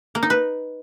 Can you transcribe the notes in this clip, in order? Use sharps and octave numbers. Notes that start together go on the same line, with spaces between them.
A#3
D#4
B4